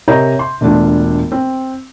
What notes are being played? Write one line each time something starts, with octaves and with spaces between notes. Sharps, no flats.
C3 A#4 C#5 D#5 A#5 G6
C6
E1 A3 D4 F4
C4